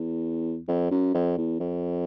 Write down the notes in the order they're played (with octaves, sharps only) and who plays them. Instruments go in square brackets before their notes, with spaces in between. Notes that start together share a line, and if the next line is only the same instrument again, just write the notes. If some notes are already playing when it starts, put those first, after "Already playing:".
Already playing: [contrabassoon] E2
F2
F#2
F2
E2
F2